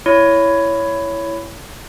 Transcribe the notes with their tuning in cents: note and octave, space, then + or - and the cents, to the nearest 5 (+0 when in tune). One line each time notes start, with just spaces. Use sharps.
E4 +10 C#5 +10